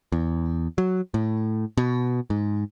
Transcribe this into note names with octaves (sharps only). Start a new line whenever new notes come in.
E2
F#3
A2
B2
G#2